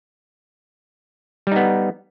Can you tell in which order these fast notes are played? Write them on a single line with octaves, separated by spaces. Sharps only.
G3 D#4 B3